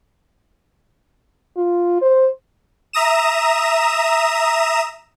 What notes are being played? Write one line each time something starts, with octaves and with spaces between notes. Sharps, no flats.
F4
C5
E5 A#5 D#6 E7